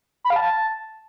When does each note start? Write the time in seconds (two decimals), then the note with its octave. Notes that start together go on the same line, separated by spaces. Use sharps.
0.25 B5
0.30 F5
0.36 A5